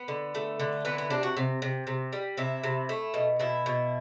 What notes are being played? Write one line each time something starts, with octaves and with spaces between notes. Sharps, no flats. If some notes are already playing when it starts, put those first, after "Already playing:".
Already playing: B3
D3
A3
D3
E3 B3
B3
C3 D4
F#4
C3
C3
C3
G3
C3 E4
C3
A3
B2
B2 E4
B2